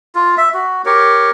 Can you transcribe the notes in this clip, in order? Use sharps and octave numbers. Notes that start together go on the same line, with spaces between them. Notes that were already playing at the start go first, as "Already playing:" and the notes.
F4
E5
F#4
G4 A#4 C#5